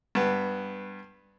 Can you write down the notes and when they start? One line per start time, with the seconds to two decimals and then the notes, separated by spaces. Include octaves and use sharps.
0.15 G2 B3